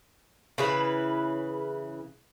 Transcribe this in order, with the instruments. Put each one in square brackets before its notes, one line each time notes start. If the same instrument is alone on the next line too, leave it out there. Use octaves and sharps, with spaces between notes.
[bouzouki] C#3 E3 B4